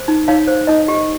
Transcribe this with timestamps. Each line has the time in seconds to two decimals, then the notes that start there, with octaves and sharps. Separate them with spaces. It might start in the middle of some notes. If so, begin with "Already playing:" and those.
Already playing: C5
0.08 D#4
0.28 D#4 C#5 F5
0.48 C5
0.67 D#4 D#5
0.88 G4